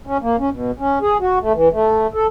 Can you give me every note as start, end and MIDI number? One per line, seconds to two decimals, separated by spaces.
0.07 0.17 61
0.22 0.36 58
0.40 0.50 61
0.52 0.71 47
0.79 0.99 61
1.02 1.17 68
1.21 1.39 66
1.41 1.52 57
1.54 1.68 52
1.72 2.07 57
2.14 2.27 69